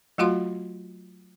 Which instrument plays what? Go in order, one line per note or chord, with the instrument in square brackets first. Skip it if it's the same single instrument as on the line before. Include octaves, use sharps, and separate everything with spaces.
[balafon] F#3 A3 F4 F#4 F5 C6